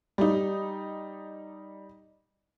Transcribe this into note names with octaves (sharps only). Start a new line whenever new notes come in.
G3 D#4